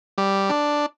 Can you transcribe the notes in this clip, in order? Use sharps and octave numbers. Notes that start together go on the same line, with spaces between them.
G3
D4